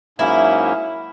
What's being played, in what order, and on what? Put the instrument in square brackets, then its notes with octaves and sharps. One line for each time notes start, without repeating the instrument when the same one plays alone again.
[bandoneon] G#2 F#3 A#3 C#4 [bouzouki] E4